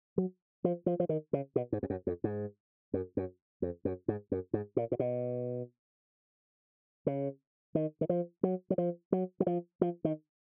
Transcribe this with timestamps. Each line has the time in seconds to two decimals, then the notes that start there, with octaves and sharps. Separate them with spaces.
0.18 F#3
0.64 F3
0.86 F3
1.00 F3
1.09 D#3
1.33 C#3
1.56 B2
1.72 G#2
1.83 F2
1.90 F#2
2.07 F2
2.24 G#2
2.94 F#2
3.17 F#2
3.62 F2
3.85 F#2
4.08 G#2
4.32 F#2
4.53 G#2
4.77 A#2
4.92 A#2
4.99 B2
7.06 C#3
7.75 D#3
8.01 D#3
8.09 F3
8.43 F#3
8.70 F#3
8.78 F3
9.12 F#3
9.40 F#3
9.47 F3
9.81 F3
10.04 D#3